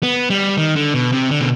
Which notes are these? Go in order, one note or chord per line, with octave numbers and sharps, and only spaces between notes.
B3
G3
D#3
D3
B2
C3
D3
B2